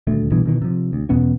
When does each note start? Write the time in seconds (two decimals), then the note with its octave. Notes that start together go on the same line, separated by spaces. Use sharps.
0.07 D#1 D2 A3
0.32 C2 G2 B2 E3
0.46 B2 D#3 E3
0.62 C3 F3
0.93 D2
1.09 E2 B2 B3 C#4